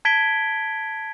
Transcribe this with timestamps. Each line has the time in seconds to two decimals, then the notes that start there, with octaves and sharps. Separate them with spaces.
0.05 A5 G#6 B6 D7 G7